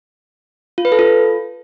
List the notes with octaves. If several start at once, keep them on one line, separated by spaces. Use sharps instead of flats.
F4
B4
A4
F4